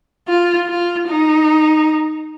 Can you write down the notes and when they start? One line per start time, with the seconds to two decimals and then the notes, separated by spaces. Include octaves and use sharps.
0.28 F4
0.68 F4
1.08 D#4